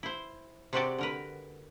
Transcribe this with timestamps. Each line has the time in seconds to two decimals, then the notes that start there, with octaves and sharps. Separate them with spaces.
0.03 E4 C5
0.73 C3 G#3 C4 F#4 G4 D5
0.98 D3 A#4 B4